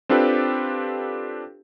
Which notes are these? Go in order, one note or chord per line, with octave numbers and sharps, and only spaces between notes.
C4 D4 F4 G4 A4 B4